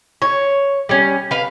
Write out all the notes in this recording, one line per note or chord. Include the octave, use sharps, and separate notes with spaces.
C#5
G3 C#4
B4 F5